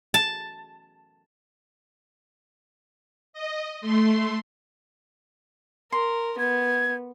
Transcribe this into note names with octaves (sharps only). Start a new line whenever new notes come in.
A5
D#5
A3 C6
A#4 C6
B3 G#6